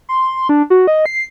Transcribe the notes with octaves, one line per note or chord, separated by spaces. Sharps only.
C6
D4
F#4
D#5
C7